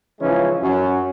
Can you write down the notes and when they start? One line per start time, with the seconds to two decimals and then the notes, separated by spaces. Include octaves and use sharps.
0.20 C#3 E3 F3 G#3 C#4 D#4
0.62 F#2 C#4 F#4